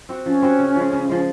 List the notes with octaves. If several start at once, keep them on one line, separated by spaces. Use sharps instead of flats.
C4 F#4
F3 C#4
C4 F#4
C#3
F3 G#3
C#3
F3 G#3